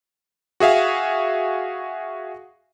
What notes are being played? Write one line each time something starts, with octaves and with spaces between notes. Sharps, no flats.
F#4 G#4 E5 F5